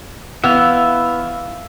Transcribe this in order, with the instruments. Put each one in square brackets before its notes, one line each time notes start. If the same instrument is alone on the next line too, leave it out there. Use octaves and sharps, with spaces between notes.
[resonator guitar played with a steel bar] E3 B3 [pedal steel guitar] E5 F5